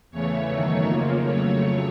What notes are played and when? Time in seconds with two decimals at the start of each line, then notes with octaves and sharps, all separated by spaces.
0.11 E2 C#3 E3 A3 C#5
0.49 F#2 D#3 F#3 A3
0.87 F2 C#3 F3 A#3
1.25 F2 C#3 F#3 A3 C#5